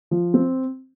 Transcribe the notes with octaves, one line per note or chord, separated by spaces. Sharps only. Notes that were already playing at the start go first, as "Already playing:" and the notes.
F3
C4